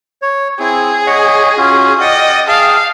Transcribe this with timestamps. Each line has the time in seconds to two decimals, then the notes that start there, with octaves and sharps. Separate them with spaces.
0.22 C#5
0.59 C4 E4 G#4
1.07 C#5 D#5 F#5
1.58 C#4 F4 F#4
2.01 D5 D#5 F#5 G5
2.48 G#4 F5 G5 A5